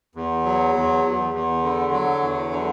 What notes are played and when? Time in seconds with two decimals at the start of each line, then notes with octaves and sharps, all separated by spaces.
0.15 E2
0.45 F#3
0.75 E2
1.04 E2
1.34 E2
1.63 D3
1.92 F#3
2.22 E2
2.51 D3